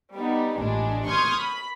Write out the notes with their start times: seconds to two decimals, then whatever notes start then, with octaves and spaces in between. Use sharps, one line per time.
0.14 G3 B3 D#4
0.57 A1 A#2 G3 G#3 D4
1.06 C6 C#6 D#6 F6 G6 G#6
1.36 B5